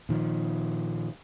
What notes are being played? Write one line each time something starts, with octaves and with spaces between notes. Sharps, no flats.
A#2 D#3 F3